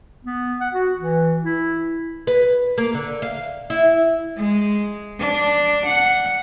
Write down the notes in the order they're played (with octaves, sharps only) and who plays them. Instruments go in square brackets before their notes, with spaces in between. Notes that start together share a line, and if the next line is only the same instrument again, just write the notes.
[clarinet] B3
F#5
F#4
E3
E4
[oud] B4
A#3
D3
F5
E4
[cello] G#3
D4
F#5